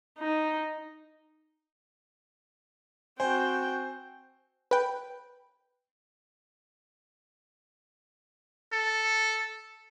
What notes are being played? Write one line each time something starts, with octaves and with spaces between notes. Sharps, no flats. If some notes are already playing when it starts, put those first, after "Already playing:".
D#4
C4 F#4 C5 G5 G#5
B4 G5
A4